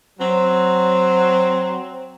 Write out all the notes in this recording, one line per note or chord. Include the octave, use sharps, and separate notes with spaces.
F#3 C4